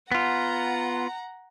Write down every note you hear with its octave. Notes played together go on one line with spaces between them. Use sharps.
B3 F4 F#5 A#5